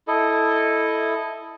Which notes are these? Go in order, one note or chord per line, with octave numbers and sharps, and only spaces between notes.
E4 A4 D#5